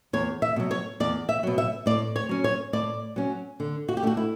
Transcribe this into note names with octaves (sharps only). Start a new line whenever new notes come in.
E2 C#5
E5
B2 F#3
C#5
E2 D5
E5
B2 F#3
E5
A2 D5
C#5
F#3 C#4
C#5
A2 D5
F#3 C#4
D3
F#4
G4
A3 D4 F#4
E4